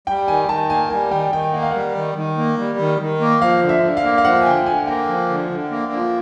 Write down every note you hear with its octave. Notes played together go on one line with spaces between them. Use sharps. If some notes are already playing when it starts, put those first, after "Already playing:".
G3 G5
D#3 G#5
D#3 A5
A#3 G#5
G3 G#5
D#3 G5
D#3 G5
A#3 F#5
F5
G3 F#5
D#3
D#3
A#3
G3
D#3
D#3
A#3
F3 F5
D3
E5
D3
F5
A#3
F5
F3 F#5
G#5
D3 G5
D3 G#5
A#3 G5
F3
D3
D3
A#3
F3